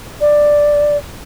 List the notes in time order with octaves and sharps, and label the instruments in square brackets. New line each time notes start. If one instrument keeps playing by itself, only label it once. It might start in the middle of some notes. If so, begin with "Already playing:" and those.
[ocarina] D5